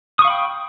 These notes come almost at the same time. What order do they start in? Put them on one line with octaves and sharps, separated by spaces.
D#6 C#6 F5 B5 G5